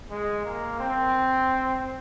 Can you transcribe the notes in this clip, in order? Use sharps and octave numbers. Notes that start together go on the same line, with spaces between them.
G#3
A#3
C4